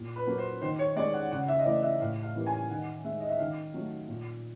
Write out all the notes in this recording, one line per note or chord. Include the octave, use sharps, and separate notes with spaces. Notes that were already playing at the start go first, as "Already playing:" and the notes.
Already playing: A#2
B4
F#3 A#3
C5
D#3 C5
C#5
G#3 D5
F#5
C#3 F#5
E5
D#5
E3 A3 D5
E5
A2 F5
F5
E3 G3 A#3
G#5
D#3 F#5
G#3 E5
D#5
E5
D#3 F5
F#3 A3
A#2